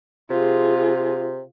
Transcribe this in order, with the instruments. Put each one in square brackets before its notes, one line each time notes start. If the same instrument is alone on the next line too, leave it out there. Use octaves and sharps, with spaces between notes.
[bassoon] C3 [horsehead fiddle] F4 G#4